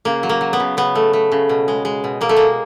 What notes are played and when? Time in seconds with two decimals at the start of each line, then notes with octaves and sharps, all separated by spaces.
0.05 C#3 A#3
0.23 F#3
0.29 A#3
0.41 F#3
0.53 B3
0.60 C#3
0.77 C#3 B3
0.95 A3
1.13 A3
1.32 C#3
1.49 B2
1.68 G#3
1.85 G#3
2.04 B2
2.21 B2 A#3
2.29 A3
2.37 G#3 A#3